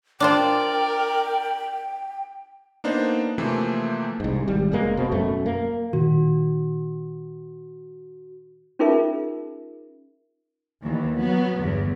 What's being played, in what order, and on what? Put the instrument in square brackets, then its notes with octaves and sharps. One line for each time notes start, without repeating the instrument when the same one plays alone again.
[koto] D4 F4 C5 [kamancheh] A#4 D5 [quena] G5
[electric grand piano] A#3 B3 D4 D#4 C5
C3 E3 F3 A3 A#3 C4
[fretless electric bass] C2 G#2
G#1 G3
F#1 B2 G#3 A#3
B2 C4
F#2 B2 A3
A#3
[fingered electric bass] A#2 D#3 [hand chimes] F#4
[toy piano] C#4 D#4 F4 G#4 A#4 E5
[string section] D#2 E3
F#3 B3
G1 E2